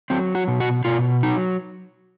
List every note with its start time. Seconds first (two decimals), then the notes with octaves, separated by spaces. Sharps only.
0.10 F#3 C4
0.35 F#4
0.48 B2
0.60 F#4
0.85 B2 F4
1.23 F#3 D#4